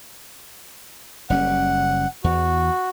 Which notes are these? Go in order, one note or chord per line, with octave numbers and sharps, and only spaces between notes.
F#1 G3 C#4 F#5
E2 F#4